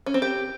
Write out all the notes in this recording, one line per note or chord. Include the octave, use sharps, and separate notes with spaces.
C#4
C4
G4